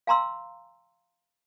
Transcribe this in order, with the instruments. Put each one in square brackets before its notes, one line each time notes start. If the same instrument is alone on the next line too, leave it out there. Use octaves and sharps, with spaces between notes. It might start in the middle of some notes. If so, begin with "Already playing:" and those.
[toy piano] F5 G#5 A#5 C6 E6